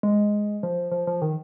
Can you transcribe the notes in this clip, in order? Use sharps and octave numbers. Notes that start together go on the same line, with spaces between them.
G#3
F3
F3
F3
D#3